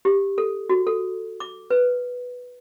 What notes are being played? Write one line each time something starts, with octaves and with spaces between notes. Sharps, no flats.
G4
A4
F#4
A4
D6
B4